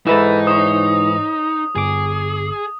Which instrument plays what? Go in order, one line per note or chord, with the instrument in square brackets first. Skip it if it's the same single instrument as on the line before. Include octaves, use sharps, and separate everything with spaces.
[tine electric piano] G#2 E3 [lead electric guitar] D#4 [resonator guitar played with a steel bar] A4 B4 E5
[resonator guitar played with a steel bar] C5 C#5 [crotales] D#6
[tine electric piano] G1 D6 [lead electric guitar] G#4